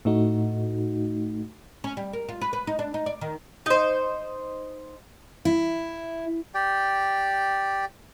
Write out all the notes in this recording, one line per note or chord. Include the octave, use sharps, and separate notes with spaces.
A2 A3 D#4 F#4
C#4
G3
A#4
F4
B4
B4
D#4
D4
D#4
D5
D#3
D#4 C5
E4
G4 D5 G5